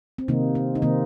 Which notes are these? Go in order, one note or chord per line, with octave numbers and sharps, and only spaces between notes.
C4
C3 D#3 A#3 D#4
C4
D#4
C3 D#3 A#3 C4